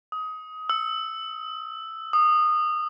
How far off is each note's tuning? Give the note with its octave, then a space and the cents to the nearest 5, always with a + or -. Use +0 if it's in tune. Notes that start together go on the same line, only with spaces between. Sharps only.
D#6 +20
E6 +0
D#6 -20